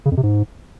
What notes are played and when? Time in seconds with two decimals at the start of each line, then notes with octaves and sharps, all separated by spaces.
0.05 C#3
0.11 F2
0.17 C3
0.23 G#2